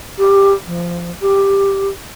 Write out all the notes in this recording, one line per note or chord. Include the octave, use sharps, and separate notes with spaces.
G4
F3
G4